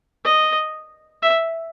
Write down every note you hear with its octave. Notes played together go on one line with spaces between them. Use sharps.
D#5
E5